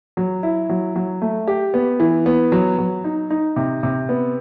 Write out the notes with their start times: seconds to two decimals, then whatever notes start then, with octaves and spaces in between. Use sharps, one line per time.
0.17 F#3
0.43 E4
0.69 F#3
0.96 F#3
1.22 A3
1.48 G4
1.74 B3
2.00 E3
2.26 B3
2.52 F#3
2.78 F#3
3.04 D#4
3.30 D#4
3.56 C3
3.83 C3
4.09 B3